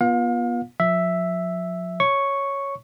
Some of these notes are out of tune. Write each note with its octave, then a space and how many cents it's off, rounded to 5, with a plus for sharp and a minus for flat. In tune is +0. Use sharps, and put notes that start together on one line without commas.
B3 -35 F4 +0 F5 +35
F3 +40 E5 +0
C#5 +0 C#6 +0